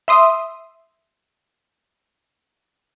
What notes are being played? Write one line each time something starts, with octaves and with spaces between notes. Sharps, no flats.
E5 C6 D#6